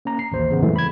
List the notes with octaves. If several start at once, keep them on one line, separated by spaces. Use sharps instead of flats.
A#3 C#4 A#5
C7
A1 D#2 C5
E2 C#3 B3
F2 A#2 E3 F#3 G#3 A3
B5 G#6